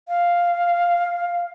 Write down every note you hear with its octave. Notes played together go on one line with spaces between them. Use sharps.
F5